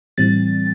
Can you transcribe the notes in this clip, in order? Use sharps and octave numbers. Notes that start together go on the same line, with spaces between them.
A2 E3 G3 C4 A6